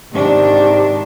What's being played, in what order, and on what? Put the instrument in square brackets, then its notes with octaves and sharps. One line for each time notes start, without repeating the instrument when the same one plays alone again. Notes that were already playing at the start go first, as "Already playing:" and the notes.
[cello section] G#2 D#3 D4 [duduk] C3